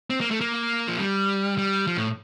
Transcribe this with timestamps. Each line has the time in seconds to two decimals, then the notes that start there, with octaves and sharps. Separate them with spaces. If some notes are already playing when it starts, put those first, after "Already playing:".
0.10 C4
0.21 A#3
0.31 A3
0.41 A#3
0.88 F3
0.98 G3
1.58 G3
1.87 F3
1.97 A2